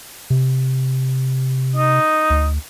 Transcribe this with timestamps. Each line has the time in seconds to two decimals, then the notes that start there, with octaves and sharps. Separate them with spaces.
0.30 C3
1.76 D#4
2.30 D2